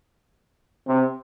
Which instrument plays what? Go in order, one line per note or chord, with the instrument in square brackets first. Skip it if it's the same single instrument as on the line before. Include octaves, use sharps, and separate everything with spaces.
[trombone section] C3